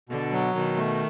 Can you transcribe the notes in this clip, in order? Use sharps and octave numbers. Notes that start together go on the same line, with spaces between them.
B2 D3
F#3
B2 D#3
A3